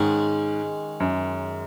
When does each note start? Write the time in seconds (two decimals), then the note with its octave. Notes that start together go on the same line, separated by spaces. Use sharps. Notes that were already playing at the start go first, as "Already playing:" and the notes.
Already playing: G#2 D#3 G#3 C#4 G#4 C#5
1.00 F#2